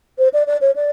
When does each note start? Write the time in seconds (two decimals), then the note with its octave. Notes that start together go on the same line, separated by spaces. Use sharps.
0.18 C5
0.33 D5
0.47 D5
0.61 C#5
0.75 D5